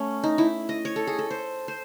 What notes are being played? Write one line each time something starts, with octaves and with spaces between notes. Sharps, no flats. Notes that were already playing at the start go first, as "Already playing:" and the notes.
Already playing: A3 C#4
D#4
E4
D#5
C#5
A4
G#4
A4
C5
C5